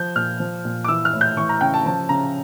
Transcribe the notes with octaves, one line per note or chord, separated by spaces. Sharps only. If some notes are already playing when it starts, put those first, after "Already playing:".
Already playing: F3 G6
A#2 F6
F3
A#2
D6
E3 E6
F6
A2
G6
E3 C#6
A#5
C#3 G5
A5
F3 A5
C#3 A#5